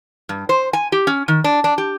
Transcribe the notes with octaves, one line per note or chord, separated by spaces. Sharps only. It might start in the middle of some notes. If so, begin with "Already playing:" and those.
G2
C5
G#5
G4
C#4
D#3
D4
D4
G4